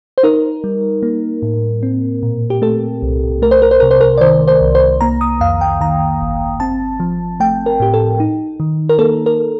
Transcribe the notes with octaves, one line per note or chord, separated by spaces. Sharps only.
C5
D#4 A#4
G3
A#3
A2
C4
A#2
G4
A3 A4
C2
A3 A#4
C5
A#4
C5
C3 A#4
C5
A#4
D5
D#3 C5
C5
C2
C5
A#3 A#5
D#6
F2 F5
G5
D#3 A#5
G1
C4 A5
F3
A3 G5
A#4
A2 G4
A4
D#4
D#3
A#4
A#3 A4
A#4